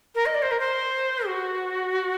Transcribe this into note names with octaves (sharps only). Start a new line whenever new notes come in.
A#4
D#5
D5
C5
A#4
C5
F#4